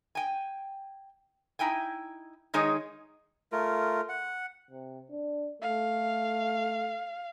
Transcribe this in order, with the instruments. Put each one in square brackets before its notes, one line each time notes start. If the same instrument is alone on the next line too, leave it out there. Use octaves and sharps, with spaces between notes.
[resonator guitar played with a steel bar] G5 G#5
D#4 E4 G5 G#5
D#3 G#3 D#4 G#4 C#5
[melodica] A3 F4 A#4
F#5
[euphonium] C3
D4
[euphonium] A3 [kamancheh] F5